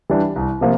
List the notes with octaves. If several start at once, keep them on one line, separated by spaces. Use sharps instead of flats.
E3 G3 D4
C2
C3 F3 A#3